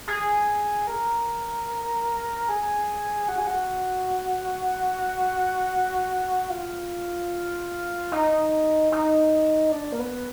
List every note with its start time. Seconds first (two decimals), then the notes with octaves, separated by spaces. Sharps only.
0.08 G#4
0.87 A#4
2.49 G#4
3.28 F#4
3.38 G#4
3.47 F#4
6.50 F4
8.12 D#4
8.92 D#4
9.72 D4
9.92 A#3
9.99 B3